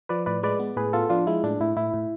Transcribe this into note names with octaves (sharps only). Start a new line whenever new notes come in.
F3 B4 D5
A2 B4 D5
G#3 B4 D5
B3
A2 G#4 B4
B3 F4 A4
F3 D4 F4
G#3 E4
A2 D4
A2 E4
A2 E4
A2